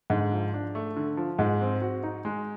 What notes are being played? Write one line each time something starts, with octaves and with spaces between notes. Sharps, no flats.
G#2 D3
F3
D4
A3
D3
F3
G#2 G#3
C4
F#4
D#4
G#3